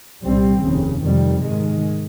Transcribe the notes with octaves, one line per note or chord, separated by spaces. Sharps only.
C2 A#2 G3 C4
F1 D#2 C#3
F2 C3 D#3 G3
G#2 D#3 G#3